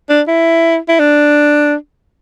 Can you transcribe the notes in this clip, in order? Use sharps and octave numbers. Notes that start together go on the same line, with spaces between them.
D4
E4
E4
D4